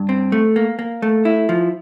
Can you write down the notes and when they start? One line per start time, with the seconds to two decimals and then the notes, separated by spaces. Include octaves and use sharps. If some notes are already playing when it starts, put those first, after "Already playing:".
Already playing: G2
0.09 C4
0.32 A3
0.56 A#3
0.79 A#3
1.02 A3
1.25 E4
1.49 F3